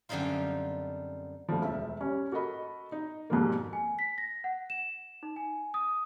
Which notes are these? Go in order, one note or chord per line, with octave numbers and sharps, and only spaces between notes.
F#2 D3 G3 C4 D#4 F4
D2 D3 F3
E1 E5
G3 C#4
F#4 A4 A#4 D#5 B5
D#4
F2 G#2 B2 F3 G3 A#3
G#5
B6
A#6
F#5
E7
D#4
G#5
D#6